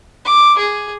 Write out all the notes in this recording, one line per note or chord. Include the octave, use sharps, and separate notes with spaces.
D6
G#4